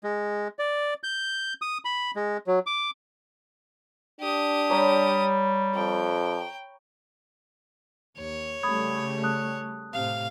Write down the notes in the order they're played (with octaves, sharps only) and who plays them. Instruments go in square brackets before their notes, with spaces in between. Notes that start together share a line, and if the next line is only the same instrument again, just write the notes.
[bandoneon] G#3
D5
G6
D#6
B5
G#3
F#3
D6
[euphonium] D4 [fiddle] G4 D#6
[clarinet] G3 [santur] C#5 A#5 B5
[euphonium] F2 [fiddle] G5
[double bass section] D#2 [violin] C#5
[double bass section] C#3 G3 A3 [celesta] B5 D#6 G#6
[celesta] A5 D#6 F#6
[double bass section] A2 C3 [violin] F5